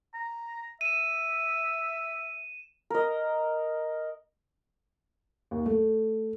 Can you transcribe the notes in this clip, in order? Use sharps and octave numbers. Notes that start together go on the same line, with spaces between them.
A#5
E5 D#7 E7
A#4 D#5
D#2
A3